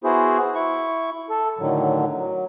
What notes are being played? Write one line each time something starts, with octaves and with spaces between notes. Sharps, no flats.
B3 E4 F#4 G#4 C5
E4 C#6
A4
A2 D3 D#3 F#3
F#3